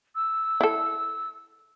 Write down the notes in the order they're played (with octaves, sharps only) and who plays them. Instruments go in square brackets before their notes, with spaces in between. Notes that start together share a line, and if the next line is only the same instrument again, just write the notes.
[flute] E6
[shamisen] E4 A4